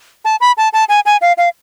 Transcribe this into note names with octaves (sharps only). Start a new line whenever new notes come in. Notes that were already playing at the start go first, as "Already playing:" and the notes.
A5
B5
A5
A5
G#5
G#5
F5
F5